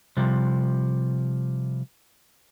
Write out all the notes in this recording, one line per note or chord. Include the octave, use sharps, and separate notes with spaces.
C3 F3 G3